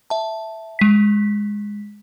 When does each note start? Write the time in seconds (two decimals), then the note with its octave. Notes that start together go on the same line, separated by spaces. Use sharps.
0.10 E5 A5
0.79 G#3 B6